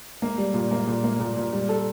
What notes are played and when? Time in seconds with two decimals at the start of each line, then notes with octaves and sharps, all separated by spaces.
0.22 A#3
0.38 G3
0.54 A#2
0.71 A#3
0.87 A#2
1.04 A#3
1.20 A#2
1.37 A#2
1.53 G3
1.69 A4